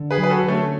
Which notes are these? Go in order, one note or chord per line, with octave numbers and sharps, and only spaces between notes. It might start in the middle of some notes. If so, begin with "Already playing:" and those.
Already playing: D3
G#4 B4
F#3
B4
F#4 A4
D3
A3 C#4